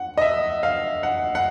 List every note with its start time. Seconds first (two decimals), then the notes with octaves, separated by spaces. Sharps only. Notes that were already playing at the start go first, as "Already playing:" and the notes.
Already playing: F#5
0.17 D#5
0.21 E5
0.63 F5
1.03 F#5
1.35 F#5